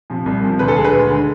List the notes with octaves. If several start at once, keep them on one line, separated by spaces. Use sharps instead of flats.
C3 F3
C2
C3 F3
D2 B4
A4
D3 G#3 G#4
B4
D2
D3 G#3